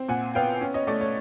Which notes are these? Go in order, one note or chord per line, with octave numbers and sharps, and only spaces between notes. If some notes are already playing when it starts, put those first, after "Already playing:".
Already playing: C4
A#2 F#5 G#5
B3 F5 G5
C#4
C#5 D#5
A3 D5
C#5